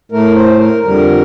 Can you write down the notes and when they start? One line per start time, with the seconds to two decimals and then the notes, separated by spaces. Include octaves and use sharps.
0.12 A2 A3 A#4
0.36 C5
0.59 A#4
0.83 F2 D3 G3 A#4